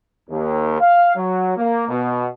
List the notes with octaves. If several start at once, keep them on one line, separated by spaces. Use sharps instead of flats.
D#2
F5
F#3
A#3
B2